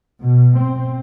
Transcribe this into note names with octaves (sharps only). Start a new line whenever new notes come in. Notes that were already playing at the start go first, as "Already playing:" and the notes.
B2
C4